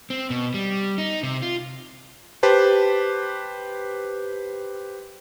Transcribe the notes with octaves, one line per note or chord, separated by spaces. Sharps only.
C4
B2
G3
D#4
C3
F4
G4 B4 C5 A5